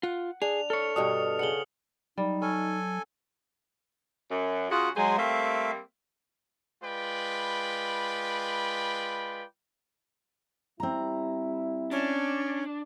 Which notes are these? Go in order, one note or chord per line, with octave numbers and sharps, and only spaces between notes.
F4 F#5
D4 G#4 F7
A4 C#5 F6 C#7
G2 B2 D4 D#6
C#3 B3 C#7 F#7 G7
F#3 G3 D#4
C#4 A4 G#5
F#2
C#3 F#3 F4 F#4 G#4
F#3 G#3 G#4 C5
G3 A3 A#3 C4 E5 F5
G#3 F4 B4 D5 G5 B5
G3 C4 E4 A#5
C#4 D4